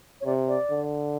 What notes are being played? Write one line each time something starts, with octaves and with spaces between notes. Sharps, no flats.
C#5
C3 D5
D5
D3